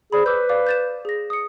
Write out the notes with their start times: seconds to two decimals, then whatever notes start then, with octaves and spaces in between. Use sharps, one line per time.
0.12 G#4 C5 D5 B5
0.26 B4 D6 E6 G6
0.49 D5 F5 D6
0.67 G6 A6 E7
1.05 G#4 A#6
1.30 D#6 C#7